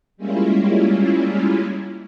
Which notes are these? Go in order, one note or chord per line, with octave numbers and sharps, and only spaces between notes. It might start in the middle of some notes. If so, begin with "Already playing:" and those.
G3 G#3 A#3 C#4 E4 F4